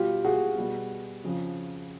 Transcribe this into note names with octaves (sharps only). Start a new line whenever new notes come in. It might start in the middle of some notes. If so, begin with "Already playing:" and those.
Already playing: B2 G3 F4 G4
F#4 G#4
B2 G3
F2 C#3 F3